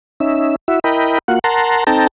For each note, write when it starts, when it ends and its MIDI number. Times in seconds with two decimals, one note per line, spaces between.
0.20 0.56 61
0.20 0.56 63
0.20 0.56 76
0.68 0.80 64
0.68 0.80 66
0.68 0.80 76
0.84 1.19 64
0.84 1.19 70
0.84 1.19 75
0.84 1.19 79
0.84 1.19 83
1.28 1.39 58
1.28 1.39 65
1.28 1.39 66
1.28 1.39 78
1.44 1.84 70
1.44 1.84 78
1.44 1.84 81
1.44 1.84 82
1.44 1.84 84
1.87 2.07 60
1.87 2.07 63
1.87 2.07 69
1.87 2.07 79
1.87 2.07 81
1.87 2.07 82